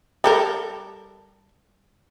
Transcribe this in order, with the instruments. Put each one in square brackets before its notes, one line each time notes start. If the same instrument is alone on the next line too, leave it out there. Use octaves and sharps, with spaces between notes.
[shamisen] G3 A4 A#4